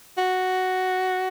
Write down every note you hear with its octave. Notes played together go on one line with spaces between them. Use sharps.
F#4